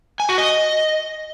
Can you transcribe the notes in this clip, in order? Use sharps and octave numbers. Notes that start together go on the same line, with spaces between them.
G#5
F#4
D#5